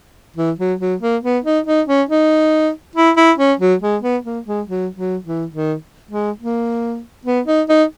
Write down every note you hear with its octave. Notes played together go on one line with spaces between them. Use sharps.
E3
F#3
F#3
A#3
B3
D#4
D#4
C#4
D#4
E4
E4
C#4
F#3
G#3
B3
A#3
G#3
F#3
F#3
E3
D#3
G#3
A#3
B3
D#4
D#4